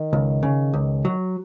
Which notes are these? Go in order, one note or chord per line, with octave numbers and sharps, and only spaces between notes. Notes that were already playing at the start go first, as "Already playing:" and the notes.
Already playing: D#3
C#2
C#3
C#2
F#3